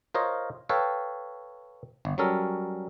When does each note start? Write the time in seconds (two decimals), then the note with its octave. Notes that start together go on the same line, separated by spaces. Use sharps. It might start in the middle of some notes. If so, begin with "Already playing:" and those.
0.14 F4 A#4 C5 C#5 D#5
0.69 A4 B4 C#5 F5 G5
2.05 G1
2.18 F#3 G3 C#4 A4 A#4